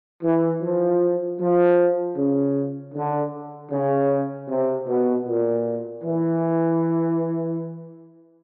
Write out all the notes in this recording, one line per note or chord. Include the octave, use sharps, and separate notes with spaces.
E3
F3
F3
C#3
D3
C#3
C3
B2
A#2
E3